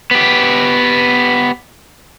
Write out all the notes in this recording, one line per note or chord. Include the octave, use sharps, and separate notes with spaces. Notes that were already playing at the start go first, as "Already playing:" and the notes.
B3 G4